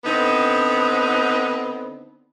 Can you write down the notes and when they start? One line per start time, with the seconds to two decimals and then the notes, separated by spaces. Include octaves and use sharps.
0.05 D3 B3 C4 D#4